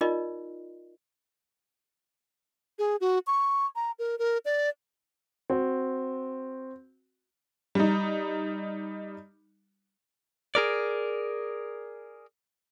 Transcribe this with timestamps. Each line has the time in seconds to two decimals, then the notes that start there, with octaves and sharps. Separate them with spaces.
0.01 D#4 F4 A#4 D5 D#5
2.79 G#4
3.01 F#4
3.27 C#6
3.76 A#5
3.99 A#4
4.19 A#4
4.45 D5
5.50 C4 F#4
7.75 G3 D#4
10.55 G#4 A#4 D5